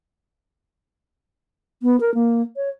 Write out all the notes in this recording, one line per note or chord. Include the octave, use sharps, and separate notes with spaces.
B3
A#4
A#3
C#5